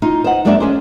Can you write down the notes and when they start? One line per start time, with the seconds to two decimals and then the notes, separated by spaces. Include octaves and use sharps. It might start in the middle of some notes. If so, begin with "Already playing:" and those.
0.02 D#4 F4
0.24 C5 D#5 F#5
0.45 F#2 G#3 A#3 D4 D5 E5
0.60 C#4 G#4 C5